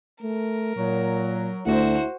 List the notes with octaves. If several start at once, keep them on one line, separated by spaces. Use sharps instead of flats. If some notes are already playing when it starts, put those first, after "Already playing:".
A3 A#4
A#2 F#3
D2 A3 E4 F#4 C5